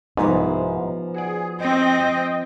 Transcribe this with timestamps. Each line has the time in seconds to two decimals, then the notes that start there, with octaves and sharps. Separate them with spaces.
0.17 C2 G#2 F3 B3 D#4
1.15 F#4 G#4 D5
1.60 C4 D#5 G5